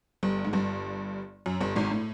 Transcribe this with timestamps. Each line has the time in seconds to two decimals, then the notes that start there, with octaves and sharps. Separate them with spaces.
0.23 G1 G2
0.45 G#2
0.53 G1 G2
1.46 F#2
1.61 G1 G2
1.76 G#1 G#2
1.91 A2